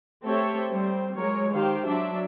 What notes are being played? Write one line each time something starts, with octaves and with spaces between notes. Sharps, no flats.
A3 C4 G4 A4 C#5 E5
G3 C4 C5
F#3 G#3 A#4 C#5
D#3 G4 C5 F5
F#3 D4 E5